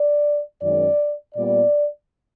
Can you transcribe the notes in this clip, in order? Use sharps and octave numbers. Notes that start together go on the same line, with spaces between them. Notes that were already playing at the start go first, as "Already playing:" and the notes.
Already playing: D5
F#2 D#3 G#3 C#4 D5
A#2 G3 B3 D5